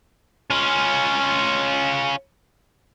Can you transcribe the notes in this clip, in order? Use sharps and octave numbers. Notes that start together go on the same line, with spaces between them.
C#4 F4